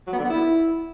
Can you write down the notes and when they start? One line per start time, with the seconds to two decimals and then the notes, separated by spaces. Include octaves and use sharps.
0.07 F#3
0.13 B3
0.19 D3
0.24 B3
0.30 E4